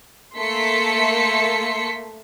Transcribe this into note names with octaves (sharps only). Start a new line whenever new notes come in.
A3 A#3 A4 C6 B6 C#7